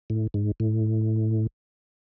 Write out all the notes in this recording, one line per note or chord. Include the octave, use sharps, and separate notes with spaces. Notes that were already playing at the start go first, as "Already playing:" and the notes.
A2
G#2
A2